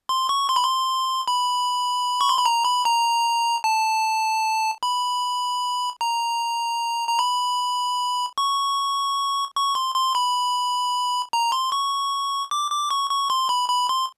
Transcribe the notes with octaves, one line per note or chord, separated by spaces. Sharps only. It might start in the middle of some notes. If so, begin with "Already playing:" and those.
C6
C#6
C6
B5
C6
B5
C#6
C6
B5
A#5
B5
A#5
A5
B5
A#5
A#5
B5
C#6
C#6
C6
C6
B5
A#5
C6
C#6
D6
D6
C#6
C#6
C6
B5
B5
C6